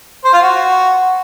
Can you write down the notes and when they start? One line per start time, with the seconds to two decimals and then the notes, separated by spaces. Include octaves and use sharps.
0.24 C5
0.33 F4
0.42 F#4